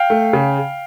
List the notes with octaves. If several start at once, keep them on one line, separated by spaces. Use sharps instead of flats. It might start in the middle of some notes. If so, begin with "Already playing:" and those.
Already playing: F5 G5
A3
C#3